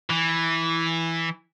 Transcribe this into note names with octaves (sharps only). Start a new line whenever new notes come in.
E3